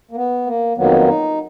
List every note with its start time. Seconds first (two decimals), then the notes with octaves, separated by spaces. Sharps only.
0.11 A#3
0.16 B3
0.46 A#3
0.77 F2 D#3 F#3 A#3 B3
1.07 D#4